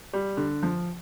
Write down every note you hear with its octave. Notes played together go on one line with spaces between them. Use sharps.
G3
D3
F3